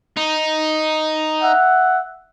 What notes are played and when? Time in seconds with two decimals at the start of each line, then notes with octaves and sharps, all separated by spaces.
0.17 D#4
1.42 E5 F#5